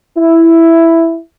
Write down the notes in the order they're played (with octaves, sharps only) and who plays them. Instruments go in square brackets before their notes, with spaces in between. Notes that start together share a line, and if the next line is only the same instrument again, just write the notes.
[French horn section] E4